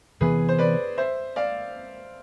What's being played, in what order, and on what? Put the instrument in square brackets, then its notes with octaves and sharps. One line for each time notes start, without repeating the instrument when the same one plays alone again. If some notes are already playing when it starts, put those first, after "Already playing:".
[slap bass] C3 E3 B3 [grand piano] G#4 B4
[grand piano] C5
B4 D5
C5 E5
D5 F5